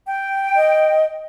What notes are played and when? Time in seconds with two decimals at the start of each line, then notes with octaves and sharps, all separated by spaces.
0.06 G5
0.56 D#5